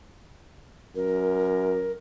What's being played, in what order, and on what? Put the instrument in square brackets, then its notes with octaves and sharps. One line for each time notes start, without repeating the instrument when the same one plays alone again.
[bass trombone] F#2 [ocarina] A#4